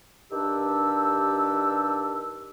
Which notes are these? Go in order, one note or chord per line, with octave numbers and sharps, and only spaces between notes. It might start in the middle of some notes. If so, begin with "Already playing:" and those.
G2 D#3 D4 G4 E6